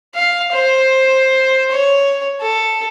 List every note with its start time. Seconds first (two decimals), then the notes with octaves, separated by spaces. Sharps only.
0.15 F5
0.52 C5
1.71 C#5
2.41 A4